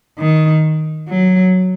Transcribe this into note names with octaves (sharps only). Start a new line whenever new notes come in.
D#3
F#3